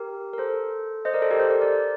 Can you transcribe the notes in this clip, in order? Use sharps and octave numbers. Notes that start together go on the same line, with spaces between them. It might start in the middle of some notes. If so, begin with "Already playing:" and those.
Already playing: G4 A#4
A#4
A4 C5
C5 D#5
A#4 D5
A4 C5
G4 A#4
A4 C5
A#4 D5
A#4 D5